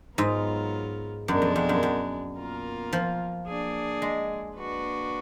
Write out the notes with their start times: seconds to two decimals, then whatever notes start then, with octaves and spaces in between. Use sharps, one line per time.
0.18 G#2 F#3 B3 F4 A#4
1.28 F#2 B2 G#3 D4
1.42 F2
1.56 F2
1.69 F#2
1.83 F#2
2.38 B2 A#3 F4 A#4
2.93 F3
3.47 A#3 D4 G#4
4.02 G#3
4.57 A#3 D4 F#4 B4